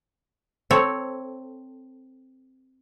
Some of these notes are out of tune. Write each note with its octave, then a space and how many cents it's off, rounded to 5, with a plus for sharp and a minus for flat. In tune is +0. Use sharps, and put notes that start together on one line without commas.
C4 +0 A4 +5 C#5 +0